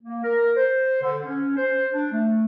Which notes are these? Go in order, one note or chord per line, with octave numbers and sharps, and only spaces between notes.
A#3
A#4
C5
D3
C#4
C5
D4
A3